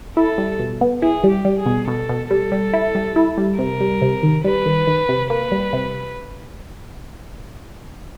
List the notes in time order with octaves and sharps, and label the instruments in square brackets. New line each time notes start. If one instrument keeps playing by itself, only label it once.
[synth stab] E4 [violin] A4
[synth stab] G3
B2
B3
[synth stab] E4 [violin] G#4
[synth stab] G3
[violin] G4
[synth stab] G3
[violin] G#4
[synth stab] B2
[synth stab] B2 [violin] A4
[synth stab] B2
[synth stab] G3 [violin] A4
[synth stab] G3
E4
G3
E4
G3
[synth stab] C3 [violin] A#4
[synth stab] G3
C3
D#3
[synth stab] G3 [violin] B4
[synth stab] D#3
D#3
C3
[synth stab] A#3 [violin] B4
[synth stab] G3
C3